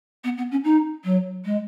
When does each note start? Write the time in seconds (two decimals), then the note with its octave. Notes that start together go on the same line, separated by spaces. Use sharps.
0.24 B3
0.37 B3
0.51 C#4
0.64 D#4
1.04 F#3
1.45 G#3